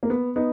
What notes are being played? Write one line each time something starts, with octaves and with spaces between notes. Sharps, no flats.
A#3
B3
B3 D#4